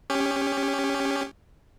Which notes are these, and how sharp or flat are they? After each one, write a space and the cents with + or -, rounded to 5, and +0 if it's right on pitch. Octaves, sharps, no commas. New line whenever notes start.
C#4 +0 G4 +20